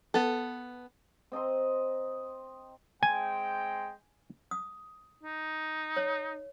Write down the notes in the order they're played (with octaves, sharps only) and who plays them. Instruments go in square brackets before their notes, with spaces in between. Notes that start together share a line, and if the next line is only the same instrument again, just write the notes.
[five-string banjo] B3 A4
[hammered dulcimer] C4 D#5 A#5 C6
[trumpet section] G#3 C4 G5 [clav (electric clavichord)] G#5
[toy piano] D#6
[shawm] D#4
[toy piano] C#5